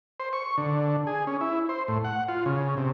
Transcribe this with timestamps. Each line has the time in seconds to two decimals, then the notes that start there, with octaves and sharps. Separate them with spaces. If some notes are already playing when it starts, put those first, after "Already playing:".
0.20 C5
0.33 C#6
0.58 D3
1.07 G#4
1.27 C#4
1.41 E4
1.69 C5
1.88 A2
2.04 F#5
2.29 F4
2.46 C#3
2.77 C3